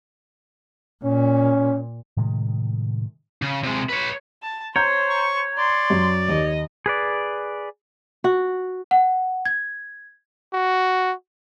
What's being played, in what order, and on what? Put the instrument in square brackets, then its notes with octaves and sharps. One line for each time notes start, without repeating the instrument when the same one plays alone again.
[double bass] A#2 [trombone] C#4
[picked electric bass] A2 C3 D#3 G#3
[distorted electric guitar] C#3
C3 G#3
B4 C#5
[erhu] A5
[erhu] C5 [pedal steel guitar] C#5 [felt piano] A#5 G6
[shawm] C#6
[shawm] D5 [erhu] C6
[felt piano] F#2
[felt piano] D#2 [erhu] D#5
[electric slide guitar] G#4 B4 D5
[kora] F#4
[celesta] F#5
G#6
[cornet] F#4